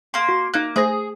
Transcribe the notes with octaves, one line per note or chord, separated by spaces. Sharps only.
A#3 C6
F#4
A#3 D#4 F#6
A3 G#4 C5 A#6